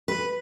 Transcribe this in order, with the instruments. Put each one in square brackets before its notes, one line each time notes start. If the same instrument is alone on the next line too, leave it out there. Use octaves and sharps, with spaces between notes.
[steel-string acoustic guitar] B4